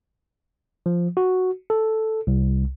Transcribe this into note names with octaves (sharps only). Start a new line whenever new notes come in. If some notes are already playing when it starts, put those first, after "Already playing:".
F3
F#4
A4
C2